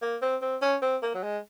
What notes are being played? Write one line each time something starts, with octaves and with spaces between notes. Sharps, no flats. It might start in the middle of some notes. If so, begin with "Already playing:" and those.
A#3
C4
C4
C#4
C4
A#3
F#3
G#3